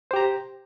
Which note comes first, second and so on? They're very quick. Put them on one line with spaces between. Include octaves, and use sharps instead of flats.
C5 G4 A#5